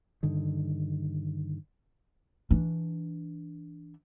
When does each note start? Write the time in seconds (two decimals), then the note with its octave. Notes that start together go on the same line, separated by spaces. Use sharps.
0.23 G2 D3 D#3
2.50 E3 D4